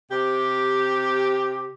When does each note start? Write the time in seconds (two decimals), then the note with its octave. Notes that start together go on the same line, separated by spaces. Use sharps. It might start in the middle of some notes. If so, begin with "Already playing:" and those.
0.10 C3 G4